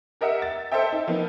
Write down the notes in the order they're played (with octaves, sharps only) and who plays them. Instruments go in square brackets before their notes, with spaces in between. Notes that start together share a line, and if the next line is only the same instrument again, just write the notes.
[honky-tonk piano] G4 A#4 D#5 E5 F#5
A6
A4 C5 D#5 E5 G5
D#4
F3 A#3 B3 D#4